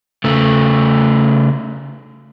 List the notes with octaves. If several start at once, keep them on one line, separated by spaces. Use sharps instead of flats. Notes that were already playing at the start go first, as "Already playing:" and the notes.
C#3 A3